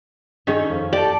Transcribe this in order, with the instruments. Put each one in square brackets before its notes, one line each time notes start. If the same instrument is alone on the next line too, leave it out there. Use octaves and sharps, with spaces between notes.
[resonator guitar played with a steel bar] D#3 C#4 C#5 [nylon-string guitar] D4 G#4 A4
[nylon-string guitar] F2
[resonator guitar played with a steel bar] G4 A4 [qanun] D5